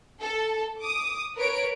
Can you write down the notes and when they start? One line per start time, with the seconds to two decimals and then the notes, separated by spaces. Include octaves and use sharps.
0.20 A4
0.81 D6 D#6
1.36 A#4 B4 C#5 D7